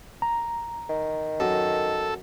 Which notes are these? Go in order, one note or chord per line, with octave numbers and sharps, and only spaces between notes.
A#5
D#3
F#2 A4